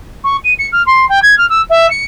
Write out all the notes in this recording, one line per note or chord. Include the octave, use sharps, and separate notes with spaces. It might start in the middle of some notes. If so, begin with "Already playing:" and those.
C#6
D#7
C#7
F6
C6
G5
G#6
F6
E6
E5
C#7